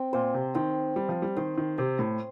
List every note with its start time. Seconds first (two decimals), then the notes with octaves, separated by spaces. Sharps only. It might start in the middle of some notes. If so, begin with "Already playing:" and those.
Already playing: C4
0.13 A#2 C5
0.34 C3
0.55 D#3 C4
0.96 G3 C5
1.09 F3
1.22 G3
1.37 D#3 C5
1.58 D#3
1.78 C3 C5
1.99 A2